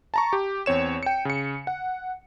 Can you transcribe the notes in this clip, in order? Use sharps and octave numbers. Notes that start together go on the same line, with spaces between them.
A5 A#5 C#6
G4
E2 C4 C#5 E7
G5 C#7
C#3 C#7
F#5